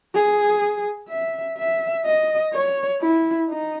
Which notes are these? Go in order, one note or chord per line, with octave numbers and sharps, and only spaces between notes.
G#4
E5
E5
D#5
C#5
E4
D#4